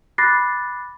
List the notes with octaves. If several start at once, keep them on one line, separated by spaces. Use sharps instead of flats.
B5 D6 F#6 A6 A#6 C7